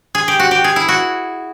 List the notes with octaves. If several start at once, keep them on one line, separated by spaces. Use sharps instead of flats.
G#4
G4
F#4
G4
G#4
E4
F#4